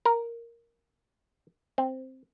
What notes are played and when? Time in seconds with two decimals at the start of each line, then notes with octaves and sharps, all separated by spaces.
0.05 A#4
1.78 C4